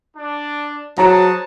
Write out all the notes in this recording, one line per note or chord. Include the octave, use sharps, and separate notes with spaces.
D4
F#3 F#4 G#4 C5 A5 A#5